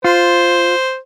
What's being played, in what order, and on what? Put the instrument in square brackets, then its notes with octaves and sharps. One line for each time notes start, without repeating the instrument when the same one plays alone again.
[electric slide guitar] F4 [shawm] C5